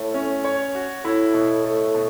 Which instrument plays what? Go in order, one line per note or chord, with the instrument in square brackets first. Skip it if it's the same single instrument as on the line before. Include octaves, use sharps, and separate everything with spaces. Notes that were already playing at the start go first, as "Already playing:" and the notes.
Already playing: [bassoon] A2 [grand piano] A3
[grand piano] C#4
C#5
F#4
[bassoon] A2 [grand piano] E4
[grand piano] B2
A3
B2